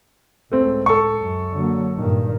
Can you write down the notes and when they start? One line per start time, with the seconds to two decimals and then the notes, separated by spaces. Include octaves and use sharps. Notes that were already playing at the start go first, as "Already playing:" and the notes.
0.51 C#2 A2 A3 C4
0.86 A4 C#6
1.21 F#2
1.54 D3 F#3 A#3
1.98 G2 A#2 D#3